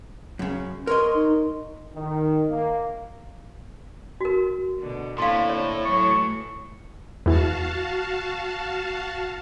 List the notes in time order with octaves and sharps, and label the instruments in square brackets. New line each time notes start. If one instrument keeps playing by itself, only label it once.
[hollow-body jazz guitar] F#2 C#3
[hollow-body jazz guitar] A#4 C#5 D#5 [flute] C6
[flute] D#4
[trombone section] D#3
A#3
[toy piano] F#4 A#4
[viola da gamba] B2 D3
[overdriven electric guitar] A2 [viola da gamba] D3 A#3 C4 [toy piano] F5 C6
[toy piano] C#5
[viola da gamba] E3 F#3 A3 [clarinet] C#6
[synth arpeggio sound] E2 E3 [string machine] F#4 F5 A5